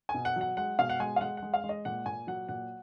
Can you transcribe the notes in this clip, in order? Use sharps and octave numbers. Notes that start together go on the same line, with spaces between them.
G#5
B2
F#5
F#3
F#5
G#3 F#5
B2 F5
F#5
G#3 G#5
F5
G#3 F#5
F#5
G#3
F5
G#3
D#5
A#2 F#5
A#2 G#5
F#3 F#5
A#2 F#5